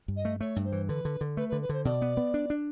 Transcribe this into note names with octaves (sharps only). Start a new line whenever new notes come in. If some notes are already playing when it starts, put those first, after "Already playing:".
G2
D#5
A3
A3 C#5
G2
C5
E3
D3 B4
D3
D3
A3 B4
B4
D3
B4
D3 C5
B2 D5
B3
B3
D4
D4